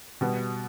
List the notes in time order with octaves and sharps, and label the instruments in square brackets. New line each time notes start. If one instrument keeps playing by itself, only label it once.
[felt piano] B2 G3 B3